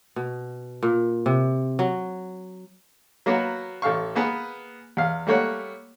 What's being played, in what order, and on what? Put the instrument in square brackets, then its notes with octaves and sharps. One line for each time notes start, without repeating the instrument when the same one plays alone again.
[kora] B2
A#2
C3
F#3
[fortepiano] F#3 A#3 B3 F#4
A1 A4 F5 C#6
A#3 B3 G#4 B4
E2 F5
G3 A3 A#3 C#5 F#5